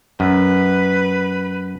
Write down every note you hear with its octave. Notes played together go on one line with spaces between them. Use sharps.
F#2 B4